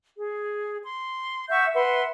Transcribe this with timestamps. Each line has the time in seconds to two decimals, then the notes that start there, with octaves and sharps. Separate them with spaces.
0.16 G#4
0.82 C6
1.49 E5 F#5 C#6 G6
1.74 B4 E5 F#5 C6